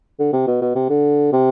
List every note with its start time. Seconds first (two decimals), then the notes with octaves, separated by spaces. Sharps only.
0.19 D3
0.33 C3
0.47 B2
0.61 B2
0.75 C3
0.90 D3
1.33 C3